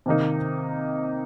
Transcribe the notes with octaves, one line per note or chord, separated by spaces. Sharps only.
C3 D#3 A#3 D#4